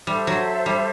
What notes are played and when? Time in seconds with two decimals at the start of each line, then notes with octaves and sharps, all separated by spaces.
0.07 G3 A4 C5 E5
0.27 F#3
0.66 G3